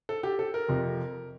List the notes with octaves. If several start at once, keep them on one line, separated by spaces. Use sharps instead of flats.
A4
G4
A4
A#4
F2 C3 F3